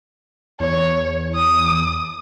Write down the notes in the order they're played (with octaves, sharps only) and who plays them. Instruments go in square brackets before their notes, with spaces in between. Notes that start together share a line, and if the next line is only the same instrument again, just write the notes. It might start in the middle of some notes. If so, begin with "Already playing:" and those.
[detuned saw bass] E2 [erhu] C#5
[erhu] D#6